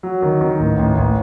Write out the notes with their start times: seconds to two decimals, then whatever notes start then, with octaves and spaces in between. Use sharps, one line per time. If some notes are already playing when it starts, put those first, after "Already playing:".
0.03 F#3
0.22 D#3
0.41 D#3
0.60 A1
0.79 A1
0.97 A1